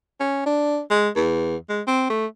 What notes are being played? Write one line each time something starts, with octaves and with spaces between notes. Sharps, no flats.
C#4
D4
G#3
E2
G#3
C4
A3